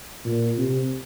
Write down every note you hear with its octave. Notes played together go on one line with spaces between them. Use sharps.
A#2
C3